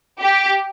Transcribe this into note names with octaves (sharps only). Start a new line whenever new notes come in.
G4